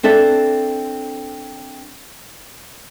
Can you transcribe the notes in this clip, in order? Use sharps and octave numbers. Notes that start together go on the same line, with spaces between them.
C4 D4 A4 E5